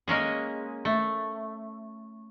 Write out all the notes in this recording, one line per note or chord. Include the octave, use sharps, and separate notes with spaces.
G#3 A#3 C#4 G#4
A3